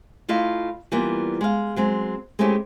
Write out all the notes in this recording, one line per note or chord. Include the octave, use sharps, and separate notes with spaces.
A3 E4 F4 D#5 F5
E3 G3 A#3 B3 F4
G#3 F5
F#3 G#3 C4
G#3 A3 C4 C#4 E4 G4